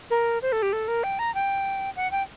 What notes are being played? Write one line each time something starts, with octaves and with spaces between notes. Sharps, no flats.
A#4
C5
A4
G4
A4
A#4
G5
A#5
G5
F#5
G5